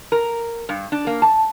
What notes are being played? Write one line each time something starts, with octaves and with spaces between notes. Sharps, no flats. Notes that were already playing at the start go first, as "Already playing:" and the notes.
A#4
G2
D4
A#3
A5